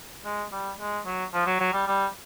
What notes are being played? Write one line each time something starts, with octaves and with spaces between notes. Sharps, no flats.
G#3
G3
G#3
F#3
F3
F#3
F#3
G3
G3